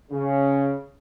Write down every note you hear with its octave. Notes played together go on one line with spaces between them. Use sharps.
C#3